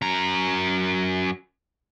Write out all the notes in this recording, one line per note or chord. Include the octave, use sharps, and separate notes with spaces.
F#2 A#5